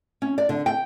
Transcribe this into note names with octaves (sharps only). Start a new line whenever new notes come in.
C#4
D5
D3
G5